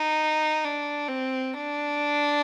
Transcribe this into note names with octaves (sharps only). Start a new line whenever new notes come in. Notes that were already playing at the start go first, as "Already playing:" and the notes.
Already playing: D#4
D4
C4
D4